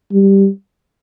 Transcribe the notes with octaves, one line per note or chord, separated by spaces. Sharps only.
G3